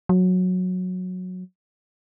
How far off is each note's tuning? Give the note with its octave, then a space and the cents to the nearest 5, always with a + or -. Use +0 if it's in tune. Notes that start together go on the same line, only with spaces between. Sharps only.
F#3 -15